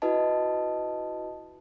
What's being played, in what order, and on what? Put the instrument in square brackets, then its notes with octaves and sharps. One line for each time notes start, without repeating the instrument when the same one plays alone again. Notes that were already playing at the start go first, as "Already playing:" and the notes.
[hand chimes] E4 F#4 B4 D#5 A5